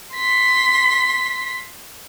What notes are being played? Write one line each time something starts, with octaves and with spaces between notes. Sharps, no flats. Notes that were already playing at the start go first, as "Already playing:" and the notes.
C6 B6